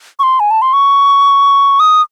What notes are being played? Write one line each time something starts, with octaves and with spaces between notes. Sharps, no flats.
C#6
C6
G#5
A5
C6
C#6
D#6